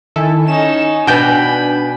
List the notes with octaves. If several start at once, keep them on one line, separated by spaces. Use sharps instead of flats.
D#3 E4 A4 G#5
C#4 D#4 E7
B2 D4 B4 G5 B5